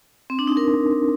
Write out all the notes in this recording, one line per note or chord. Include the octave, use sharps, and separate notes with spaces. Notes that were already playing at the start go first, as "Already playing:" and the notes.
C4
D4
D#4
A#4